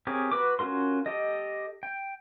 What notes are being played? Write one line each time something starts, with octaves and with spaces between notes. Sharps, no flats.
C4 G4 G#4 A#4 C#5
F#4 B4 D6
C#4 F4 F#4 A#4 C6
G4 A4 D#5
G5